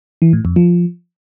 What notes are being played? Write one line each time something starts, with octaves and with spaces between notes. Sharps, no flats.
E3
A2
F2
F3